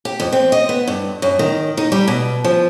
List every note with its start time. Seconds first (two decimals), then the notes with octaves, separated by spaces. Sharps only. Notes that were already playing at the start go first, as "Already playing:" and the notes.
0.05 G4
0.20 F2
0.33 C4
0.52 D#5
0.69 B3
0.87 G2
1.22 F#2
1.39 D#3
1.77 D#4
1.92 G3
2.08 B2
2.45 F3